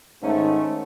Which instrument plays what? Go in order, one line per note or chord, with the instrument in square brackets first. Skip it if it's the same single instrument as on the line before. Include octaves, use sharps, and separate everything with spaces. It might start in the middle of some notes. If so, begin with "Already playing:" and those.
[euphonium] G#2 [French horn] D#3 [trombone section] A3 [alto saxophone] C#4